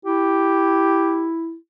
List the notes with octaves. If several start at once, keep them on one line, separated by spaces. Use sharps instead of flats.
E4 G4